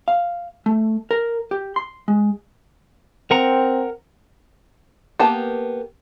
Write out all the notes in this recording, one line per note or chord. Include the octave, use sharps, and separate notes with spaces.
F5
A3
A#4
G4
C6
G#3
C4 A#4 F#5 A#5
A#3 B3 G4 A5